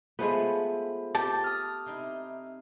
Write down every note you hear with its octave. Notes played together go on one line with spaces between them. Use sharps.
F3 G#3 A3 B3 E4 F4 C5 B5
G4 A5
D#6 F6
C3 D#4 E4